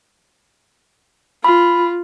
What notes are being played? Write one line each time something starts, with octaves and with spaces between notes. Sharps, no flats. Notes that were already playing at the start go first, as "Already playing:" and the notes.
F4 B5